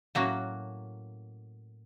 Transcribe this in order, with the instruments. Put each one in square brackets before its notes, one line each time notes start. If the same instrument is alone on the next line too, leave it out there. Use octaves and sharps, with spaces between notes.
[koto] A2 F#3 A#3 C#4 F#4